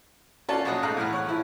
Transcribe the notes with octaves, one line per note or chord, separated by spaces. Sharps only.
C#4 F4 F#4 A4 D5 A5
A#1 F#3 D#5 F#5 D#6 F#6
G#2 A3 F5 A#5 F#6
A2 E3 F#5 F6
C#5 F#5
F3 E4